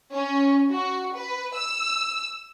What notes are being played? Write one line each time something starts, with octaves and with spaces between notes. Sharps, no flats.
C#4
F#4
B4
E6